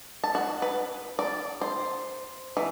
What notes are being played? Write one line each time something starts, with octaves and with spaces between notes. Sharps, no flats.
A5
F#4
B4
D5
C5
E3